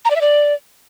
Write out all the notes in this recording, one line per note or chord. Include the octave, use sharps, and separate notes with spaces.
A#5
D5
E5
D5